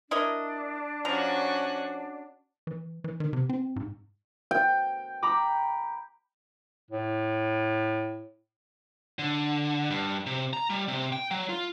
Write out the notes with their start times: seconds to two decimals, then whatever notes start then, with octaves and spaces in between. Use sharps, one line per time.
0.11 D4 E4 A#4 D#5 A5
1.05 F3 C#4 F#4 A#5
2.67 E3
3.04 E3
3.20 D#3
3.33 C3
3.49 C4
3.76 G#2
4.51 G5
5.22 A#5 B5 D6
6.91 A2
9.19 D3
9.90 G2
10.26 C3
10.53 A#5
10.70 G3
10.88 C3
11.13 G5
11.31 F#3
11.49 F4